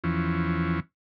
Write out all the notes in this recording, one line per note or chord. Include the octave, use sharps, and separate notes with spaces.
E2 E3 F3 C#4